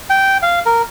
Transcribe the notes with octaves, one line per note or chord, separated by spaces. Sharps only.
G5
F5
A#4